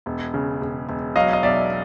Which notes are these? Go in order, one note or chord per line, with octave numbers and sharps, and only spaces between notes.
E1
C#3
E1
E1
F#3 D#5 F5
D#5
B1 D5 E5